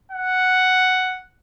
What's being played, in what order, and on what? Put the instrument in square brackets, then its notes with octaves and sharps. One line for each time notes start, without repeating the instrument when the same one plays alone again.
[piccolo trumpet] F#5